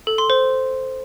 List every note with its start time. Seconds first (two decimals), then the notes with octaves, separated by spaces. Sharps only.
0.07 A4
0.18 C6
0.30 C5